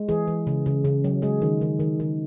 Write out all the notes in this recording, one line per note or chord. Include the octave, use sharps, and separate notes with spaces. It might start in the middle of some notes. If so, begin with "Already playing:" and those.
Already playing: G#3
E3 G#4
E3
C#3
C#3
C#3
F#3
G#3 G#4
D#3
D#3
D#3
D#3